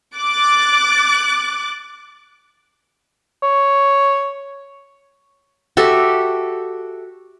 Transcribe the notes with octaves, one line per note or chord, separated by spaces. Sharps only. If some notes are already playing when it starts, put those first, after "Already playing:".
D6 F#6 A6
C#5
F#4 G4 A4 E5